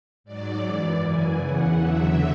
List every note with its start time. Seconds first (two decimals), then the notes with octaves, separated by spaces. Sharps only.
0.24 G#2 F#3 D5
0.63 F#2 E3 D5
1.00 F#2 C#3 E3 G#5
1.39 E2 C#3 E3 F#5
1.76 E2 D3 F#3 E5